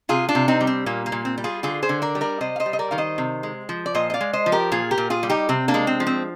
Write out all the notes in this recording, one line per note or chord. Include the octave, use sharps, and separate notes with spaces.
C3 F4 G#4
D4 F4
C3
C4 D#4
G3
C4
A#2 A#3
A#3
A#2
C4
G3
F4 G#4
D3 F4 G#4
G#4 C5
D3
A#4 D5
G3
A#4 D5
C3 C5 D#5
F5
C5 D#5
G3
D#5
A#4 D5
D#3 F5
C5 D#5
C3
G#3
F3
D5
A#2 C5 D#5
D#5
D5 F5
G#3
C5 D#5
F3
G4 A#4
A#2 F4 G#4
G4 A#4
A#2
F4 G#4
G3
D#4 G4
C3 C4
A#3 D4
G#3
C4
F3
C4